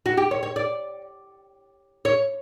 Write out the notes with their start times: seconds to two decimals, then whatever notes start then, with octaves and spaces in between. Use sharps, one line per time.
0.06 F#4
0.17 G4
0.31 C#5
0.43 C#5
0.56 D5
2.05 C#5